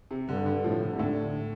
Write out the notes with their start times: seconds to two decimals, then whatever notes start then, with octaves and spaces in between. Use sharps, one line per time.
0.11 C3
0.29 G2 D3
0.46 D3
0.64 A2 F3
0.83 D3
0.93 C3
0.99 A2 D3